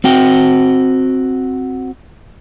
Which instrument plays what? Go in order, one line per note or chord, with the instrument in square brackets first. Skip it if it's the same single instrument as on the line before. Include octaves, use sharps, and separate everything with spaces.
[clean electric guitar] C4 F#4 G5